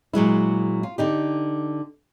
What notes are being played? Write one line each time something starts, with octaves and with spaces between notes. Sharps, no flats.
A#2 F#3 G#3 E4
F4
D3 D#4 G4